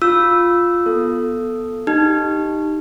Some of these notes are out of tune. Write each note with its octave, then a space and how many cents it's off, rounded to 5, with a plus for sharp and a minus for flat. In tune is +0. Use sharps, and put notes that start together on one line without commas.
F4 +0 E6 +0
B3 -5 A4 +0
D#4 +0 G4 +0